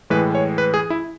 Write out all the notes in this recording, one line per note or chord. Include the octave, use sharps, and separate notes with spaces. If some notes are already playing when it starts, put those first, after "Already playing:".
A2 E3 G#3 B4
C#5
B4
G#4
E4